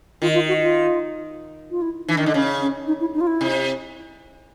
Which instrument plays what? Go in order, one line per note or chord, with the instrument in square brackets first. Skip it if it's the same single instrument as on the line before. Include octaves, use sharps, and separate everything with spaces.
[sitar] D#3 [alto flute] F4
[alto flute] F4
F#4
F4
F4
E4
[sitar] E3 [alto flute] D#4
[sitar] D#3 [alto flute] D4
[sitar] D3 [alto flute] D#4
[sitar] C#3 [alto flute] C#4
[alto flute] C#4
D#4
E4
D#4
F4
E4
[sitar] C3